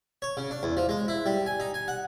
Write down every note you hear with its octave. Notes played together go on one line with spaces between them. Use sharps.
C#5
C#3
D4
E2
F3
G#3
E4
G3
G#5
D#4
G#5
F#5